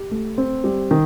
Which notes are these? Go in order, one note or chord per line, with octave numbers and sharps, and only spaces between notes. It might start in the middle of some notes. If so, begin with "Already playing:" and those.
Already playing: G4
A3
C4
G3
D#3